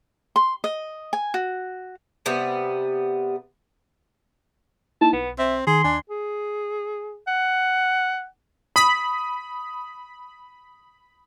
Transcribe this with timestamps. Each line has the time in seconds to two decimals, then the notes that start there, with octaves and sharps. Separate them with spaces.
0.36 C6
0.64 D#5
1.13 G#5
1.34 F#4
2.26 C3 G3 B3
5.01 A#3 D#4 E4 A5
5.13 B1 B3
5.38 C4 E5
5.67 D#3 G#4 C6
5.84 D#2 D4 G#5
6.09 G#4
7.28 F#5
8.76 B5 D#6